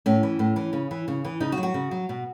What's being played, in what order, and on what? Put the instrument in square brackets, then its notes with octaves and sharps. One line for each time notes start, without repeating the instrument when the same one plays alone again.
[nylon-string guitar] A2 C#4
E3
A2
E3
C#3
E3
C#3
E3
C#3 D#4
F#4
F#3
F#4
C#3
F#3
B2